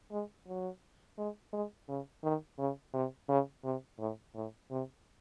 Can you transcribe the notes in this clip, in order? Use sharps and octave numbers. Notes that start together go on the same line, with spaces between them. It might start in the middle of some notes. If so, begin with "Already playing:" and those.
G#3
F#3
G#3
G#3
C#3
D#3
C#3
C3
C#3
C3
A2
A2
C3